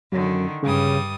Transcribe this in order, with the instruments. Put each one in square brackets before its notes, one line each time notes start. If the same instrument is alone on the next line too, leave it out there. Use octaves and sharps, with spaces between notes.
[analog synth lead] F#2 [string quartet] D3 D#3
[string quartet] G2 G3 D#6 [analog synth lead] C#3